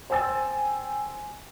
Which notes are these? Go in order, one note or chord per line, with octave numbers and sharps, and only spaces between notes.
C5 G5 G#5 E6 A6